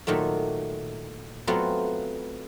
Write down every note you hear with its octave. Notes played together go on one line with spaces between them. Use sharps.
A#2 D#3 F#3 A3
F#3 A3 B3 C4 F4 F#4